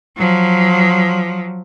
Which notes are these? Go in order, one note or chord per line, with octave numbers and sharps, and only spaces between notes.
F3 F#3